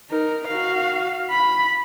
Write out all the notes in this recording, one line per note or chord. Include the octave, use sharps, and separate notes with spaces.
D#4 A#4
F#4 F5
B5